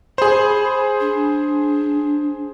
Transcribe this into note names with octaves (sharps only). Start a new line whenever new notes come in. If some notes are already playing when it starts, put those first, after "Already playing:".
G#4 C5 B5
D4